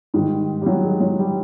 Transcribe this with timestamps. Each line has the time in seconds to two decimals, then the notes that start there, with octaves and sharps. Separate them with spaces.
0.14 G#2 D#3 G3
0.62 G3
0.66 F#3
0.84 G#3
1.01 F#3
1.19 G3